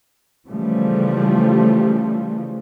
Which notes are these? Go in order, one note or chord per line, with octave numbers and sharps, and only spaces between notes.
C#3 E3 F3 G3 A3